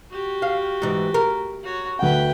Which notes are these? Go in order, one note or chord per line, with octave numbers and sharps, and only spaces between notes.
F#4 G4
F5
G#2 E3
A#4
F#4 C#5
D2 B4 F#5 G5